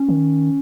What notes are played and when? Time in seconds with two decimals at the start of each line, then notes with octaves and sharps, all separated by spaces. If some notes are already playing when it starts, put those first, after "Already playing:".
Already playing: C#4
0.09 D#3